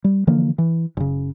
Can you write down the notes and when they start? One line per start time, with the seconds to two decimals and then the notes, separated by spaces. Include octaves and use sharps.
0.04 G3
0.27 D3 E3 F3 A#3
0.58 E3
0.97 F#1 C#3